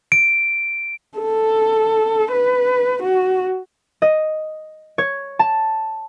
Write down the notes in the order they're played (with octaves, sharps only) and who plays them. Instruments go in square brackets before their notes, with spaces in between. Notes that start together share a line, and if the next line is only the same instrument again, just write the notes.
[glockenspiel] D7
[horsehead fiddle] A4
B4
F#4
[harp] D#5
C#5
A5